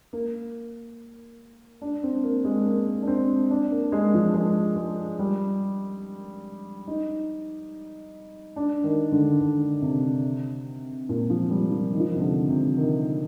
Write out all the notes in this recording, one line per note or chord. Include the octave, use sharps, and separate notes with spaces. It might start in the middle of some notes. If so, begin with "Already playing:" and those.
A#3
D4
C4
A#3
G#3
A#3
D4
C4
D4
A#3
G#3
F3
G#3
G#3
G3
D#4
D4
D#3
D3
D3
C3
A#2
F3
G3
F3
D#3
F3
D#3
C3
D3
C3
D#3